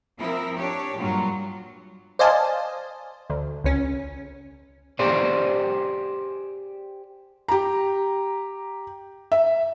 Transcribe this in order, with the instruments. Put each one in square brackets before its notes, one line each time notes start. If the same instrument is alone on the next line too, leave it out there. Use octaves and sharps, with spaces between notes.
[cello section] F3 C4 E4 A#4
D4 G4 C#5
G2 A#2 F#3 F4
[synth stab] C5 D5 D#5 F5 G#5 A5
D2
C#2 C#4
[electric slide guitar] G4 G#4 C5 D5
[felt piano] G4 A#5
E5